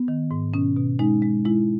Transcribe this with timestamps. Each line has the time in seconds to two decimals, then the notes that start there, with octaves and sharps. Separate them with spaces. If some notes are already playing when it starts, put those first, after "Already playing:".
Already playing: B3
0.08 D#3
0.31 G#2
0.54 B2 C#4
0.76 B2
0.99 G#3 D#4
1.22 G#3
1.45 G#3 E4